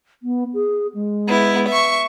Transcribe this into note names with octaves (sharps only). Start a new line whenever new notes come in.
B3
G#4
G#3
B3 E4
E5 C#6